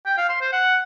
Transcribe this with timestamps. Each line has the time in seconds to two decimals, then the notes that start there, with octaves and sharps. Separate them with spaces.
0.06 G5
0.18 F5
0.29 C6
0.41 C5
0.53 F#5